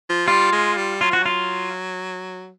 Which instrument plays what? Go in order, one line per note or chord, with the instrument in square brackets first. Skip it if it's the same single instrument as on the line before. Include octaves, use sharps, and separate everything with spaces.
[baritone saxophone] F3
[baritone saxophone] G3 [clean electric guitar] F4
[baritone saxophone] G#3
G3
[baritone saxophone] F#3 [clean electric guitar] F4
[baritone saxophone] F3 [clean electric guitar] F#4
[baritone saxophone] F#3 [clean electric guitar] F4